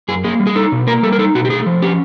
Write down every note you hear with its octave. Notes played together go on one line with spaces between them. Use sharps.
F#2 G#4
A#3 G#4
G3
G#4
D#4 A4
B2
A#3 A#4
G3 A4
A#4
D#4 A4
B2 F#4
G4
A3 G#4
F3
C#4 G4